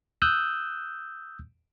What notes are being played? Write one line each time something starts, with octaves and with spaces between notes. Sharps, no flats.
D#6 E6 F#6 G6